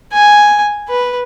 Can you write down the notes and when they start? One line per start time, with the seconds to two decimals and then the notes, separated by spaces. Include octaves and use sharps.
0.13 G#5
0.89 B4